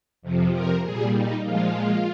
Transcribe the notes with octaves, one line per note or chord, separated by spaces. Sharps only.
F2 C3 F3
A#4
A#2 G3 G#4
D#4
A#2 F3 G#3 F4